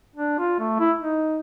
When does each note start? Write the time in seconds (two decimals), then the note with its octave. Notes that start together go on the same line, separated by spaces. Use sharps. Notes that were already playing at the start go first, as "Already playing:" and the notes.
0.16 D4
0.39 F4
0.59 A3
0.79 E4
0.98 D#4